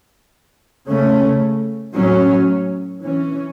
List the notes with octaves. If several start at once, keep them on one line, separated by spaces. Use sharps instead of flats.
C#3 A3 C#4
A2 F#3 C#4
E3 C#4